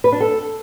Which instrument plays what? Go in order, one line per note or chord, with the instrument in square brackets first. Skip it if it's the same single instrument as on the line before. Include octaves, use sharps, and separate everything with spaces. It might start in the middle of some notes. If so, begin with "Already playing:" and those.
[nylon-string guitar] B4
D4
A4